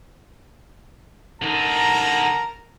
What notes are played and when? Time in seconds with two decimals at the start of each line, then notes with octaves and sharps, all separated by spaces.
1.42 D3 D#4 A#4 A5 A#5